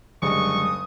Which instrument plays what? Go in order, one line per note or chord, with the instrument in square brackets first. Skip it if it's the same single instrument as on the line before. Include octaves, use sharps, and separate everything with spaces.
[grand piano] F#1 [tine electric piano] D3 G3 G#3 [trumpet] C#6 [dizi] D#6